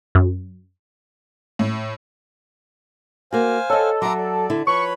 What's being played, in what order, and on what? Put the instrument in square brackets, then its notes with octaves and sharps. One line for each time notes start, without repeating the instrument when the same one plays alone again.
[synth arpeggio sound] F#2
[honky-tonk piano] A2
[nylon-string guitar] A#3 F#4 [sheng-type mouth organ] C5 F5 G#5
[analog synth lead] A4 [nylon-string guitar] C#5 D#5
[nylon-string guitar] F#3 E5 [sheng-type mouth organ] A#5 C6 D6
[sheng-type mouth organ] D5
[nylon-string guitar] D3 E4
[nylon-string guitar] F3 [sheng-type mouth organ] B4 C#5 B5 [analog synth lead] C#6